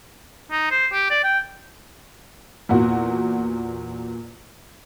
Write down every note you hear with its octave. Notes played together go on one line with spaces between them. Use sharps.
D#4
C5
G4
D5
G5
E2 A#2 F#4